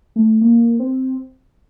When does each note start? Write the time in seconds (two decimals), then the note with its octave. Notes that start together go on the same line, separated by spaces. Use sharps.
0.16 A3
0.41 A#3
0.79 C4